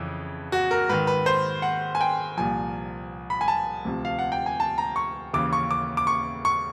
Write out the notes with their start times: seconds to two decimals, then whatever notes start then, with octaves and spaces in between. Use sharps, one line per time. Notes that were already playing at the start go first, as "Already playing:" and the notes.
Already playing: F2 C#3 E3
0.52 F#4
0.71 A#4
0.89 G#2 D#3 B4
1.07 B4
1.26 C5
1.62 F#5
1.95 G#5
2.01 G5
2.37 C2 A#2 F3 G#5
3.30 B5
3.41 G#5
3.48 A5
3.85 D2 C3 F3
4.05 F5
4.19 F#5
4.32 G5
4.46 G#5
4.60 A5
4.78 A#5
4.96 C#6
5.33 D#2 C#3 E3 D6
5.53 C#6
5.71 D6
5.97 D6
6.07 C#6
6.45 C#6